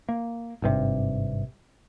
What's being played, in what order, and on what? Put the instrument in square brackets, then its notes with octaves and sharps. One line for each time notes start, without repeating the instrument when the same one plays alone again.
[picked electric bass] A#3
G#1 G2 C3